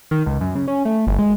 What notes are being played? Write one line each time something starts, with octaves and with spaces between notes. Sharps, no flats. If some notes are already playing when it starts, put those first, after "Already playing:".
D#3
C#2
F#2
C#3
C#4
A3
G1
G#3